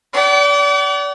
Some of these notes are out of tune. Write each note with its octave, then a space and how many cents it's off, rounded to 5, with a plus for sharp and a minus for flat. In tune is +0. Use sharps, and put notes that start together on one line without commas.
D5 -35 F#5 +45